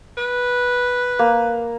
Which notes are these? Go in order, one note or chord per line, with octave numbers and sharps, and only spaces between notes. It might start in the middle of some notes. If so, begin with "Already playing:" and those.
B4
A#3